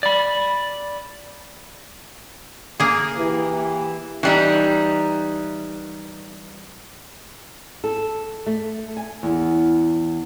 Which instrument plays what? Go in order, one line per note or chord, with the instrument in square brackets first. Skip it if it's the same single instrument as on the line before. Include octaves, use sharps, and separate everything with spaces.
[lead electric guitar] D5 B5
[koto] A#3 G#4
[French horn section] E3 G4
[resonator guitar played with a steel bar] E3 G3 D#4
[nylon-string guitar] A4
A3
G#5
E2